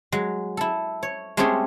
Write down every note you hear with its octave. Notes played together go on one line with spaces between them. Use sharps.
F#3 G#3
E4 A4
C#5
G#3 A3 C4 C#4 G4 G#4